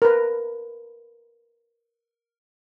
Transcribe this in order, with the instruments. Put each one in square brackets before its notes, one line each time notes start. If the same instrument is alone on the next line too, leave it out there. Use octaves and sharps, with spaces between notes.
[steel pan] A#4 B4